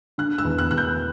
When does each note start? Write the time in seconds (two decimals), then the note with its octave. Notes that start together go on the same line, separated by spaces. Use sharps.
0.18 D3 F#6
0.38 E6
0.45 E2
0.58 F#6
0.71 E2 F#6
0.78 G6